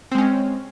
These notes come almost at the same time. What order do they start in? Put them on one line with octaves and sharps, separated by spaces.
C4 G#3 C#4